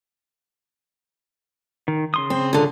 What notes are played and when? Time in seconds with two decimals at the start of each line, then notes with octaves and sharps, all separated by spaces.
1.88 D#3
2.14 C#3 C6 D#6
2.30 C4
2.53 A#2 D3